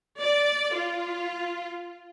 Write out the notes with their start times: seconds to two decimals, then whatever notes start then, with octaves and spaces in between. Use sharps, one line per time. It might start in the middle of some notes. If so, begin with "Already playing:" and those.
0.20 D5
0.76 F4